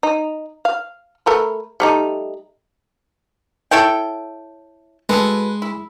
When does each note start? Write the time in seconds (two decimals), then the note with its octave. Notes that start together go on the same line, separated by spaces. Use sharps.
0.03 D#4
0.65 F5
1.26 A3 A#4 B4
1.80 G3 A3 D#4
3.71 E4 A4 C#5 G5
5.09 F#3 G#3 A4 B4
5.62 E4